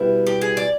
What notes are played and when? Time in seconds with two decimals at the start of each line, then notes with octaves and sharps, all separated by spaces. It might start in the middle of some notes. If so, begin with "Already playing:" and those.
Already playing: B2 G3 B3 E4
0.27 G4
0.42 G#4
0.57 D5